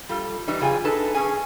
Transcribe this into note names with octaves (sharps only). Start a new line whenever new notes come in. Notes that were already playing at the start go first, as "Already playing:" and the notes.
G3 F4 A4
E3 G3 D#4
F#2 C#3 F4 G#4 G5 G#5
D4 D#4 A4 B4 A5
C#4 G#4 G#5